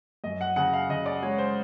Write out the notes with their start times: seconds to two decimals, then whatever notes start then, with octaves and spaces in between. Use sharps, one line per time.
0.24 F#2 D#5
0.41 F#5
0.56 C#3 F#5
0.73 F5
0.89 C#3 D#5
1.06 D5
1.22 G#3 C#5
1.38 C5